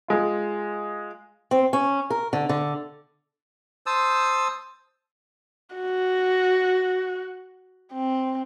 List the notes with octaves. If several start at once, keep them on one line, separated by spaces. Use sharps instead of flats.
G#3 F4
C4
C#4
A#4
D3
D3
C5 A5 D#6 E6
F#4
C4